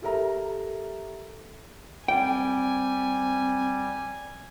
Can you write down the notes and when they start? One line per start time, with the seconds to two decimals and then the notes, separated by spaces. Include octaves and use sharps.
0.02 G4 A4 A#4 E5 A#5
2.08 G3 C4 G5 G#5